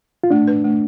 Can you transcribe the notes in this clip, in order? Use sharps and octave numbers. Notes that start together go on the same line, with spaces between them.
F4
A3 D4
B4
A3